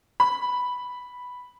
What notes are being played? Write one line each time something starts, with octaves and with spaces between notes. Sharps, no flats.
B5